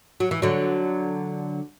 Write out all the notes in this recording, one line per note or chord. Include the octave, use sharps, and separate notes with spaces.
F#3
E3
D3 F#3